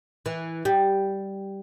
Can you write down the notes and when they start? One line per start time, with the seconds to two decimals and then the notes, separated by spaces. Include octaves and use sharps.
0.26 E3
0.65 G3